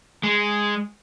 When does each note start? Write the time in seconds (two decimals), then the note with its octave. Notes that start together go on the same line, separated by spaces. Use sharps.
0.23 G#3